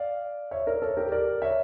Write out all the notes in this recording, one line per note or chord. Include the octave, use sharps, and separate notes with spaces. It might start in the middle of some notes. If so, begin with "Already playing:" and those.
Already playing: D5 F5
C#5 E5
A#4 D5
A4 C#5
G4 A#4
A#4 D5
C#5 E5